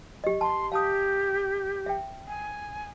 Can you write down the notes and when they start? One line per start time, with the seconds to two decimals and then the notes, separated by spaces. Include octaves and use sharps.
0.24 G4 D#5
0.41 A5 C6
0.72 G4 F5 A5 D#6
1.86 E5 G5
2.27 G#5